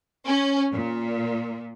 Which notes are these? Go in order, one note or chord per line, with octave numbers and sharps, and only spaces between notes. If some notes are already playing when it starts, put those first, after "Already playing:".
C#4
A#2